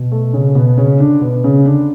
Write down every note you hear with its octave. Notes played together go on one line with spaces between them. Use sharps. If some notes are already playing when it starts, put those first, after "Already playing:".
Already playing: B2
A3
C#3 C#4
B2 B3
C#3 C#4
D3 D4
B2 B3
C#3 C#4
D3 D4